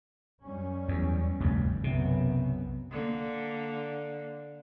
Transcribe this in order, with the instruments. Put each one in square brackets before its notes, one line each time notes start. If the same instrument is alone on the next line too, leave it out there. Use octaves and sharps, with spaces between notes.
[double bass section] F#2 G3 C#4
[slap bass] E2
F1 D2 G2
[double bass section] B1 F#2 B3 [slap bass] C3
[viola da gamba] D3 A#3